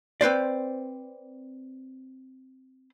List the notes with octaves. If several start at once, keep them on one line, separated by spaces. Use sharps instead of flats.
C4 B4 C5 D5